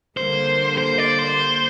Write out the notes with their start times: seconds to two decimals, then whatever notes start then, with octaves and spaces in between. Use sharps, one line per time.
0.17 D3 G3 A#3 C5
0.78 C5
0.98 D5
1.19 C5